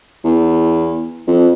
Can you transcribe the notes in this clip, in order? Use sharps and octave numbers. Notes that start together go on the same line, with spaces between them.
E2
F2